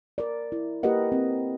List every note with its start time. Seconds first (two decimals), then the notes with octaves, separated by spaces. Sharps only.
0.18 A#4 D5
0.52 E4
0.83 A#3 G4 A#4 B4 D#5 F#5
1.12 C4